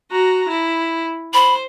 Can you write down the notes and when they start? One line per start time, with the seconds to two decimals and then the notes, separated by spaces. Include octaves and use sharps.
0.11 F#4 A#5
0.49 E4
1.34 C5 B5